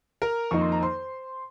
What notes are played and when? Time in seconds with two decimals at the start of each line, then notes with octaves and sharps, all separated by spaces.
0.22 A#4 A#5
0.51 F2 D#3 A#3 D#4 C#6
0.61 C6
0.72 A#5
0.82 C5 C6